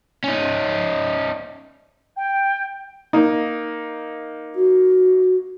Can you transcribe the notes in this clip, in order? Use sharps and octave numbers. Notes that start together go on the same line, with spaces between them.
C#4 D#4
G5
A#3 D#4
F#4